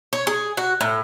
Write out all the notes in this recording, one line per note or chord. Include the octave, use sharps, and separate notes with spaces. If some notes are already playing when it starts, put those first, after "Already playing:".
C#5
G#4
F#4
A2